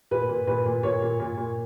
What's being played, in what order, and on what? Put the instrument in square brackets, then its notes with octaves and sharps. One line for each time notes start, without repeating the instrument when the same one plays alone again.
[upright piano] A#2 B4
A#2
A#2 B4
A#2
A#2 C#5
A#2
A#2
A#2